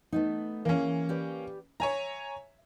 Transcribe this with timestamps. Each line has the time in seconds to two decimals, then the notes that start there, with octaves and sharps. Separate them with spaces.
0.12 A3 B3 D#4
0.65 E3 A#3 C#4 G#4
1.09 G4 B4 D5
1.80 C#5 E5 G#5 A#5